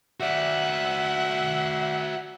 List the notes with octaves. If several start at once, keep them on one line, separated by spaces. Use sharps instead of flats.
F#4 D5 E5 F#5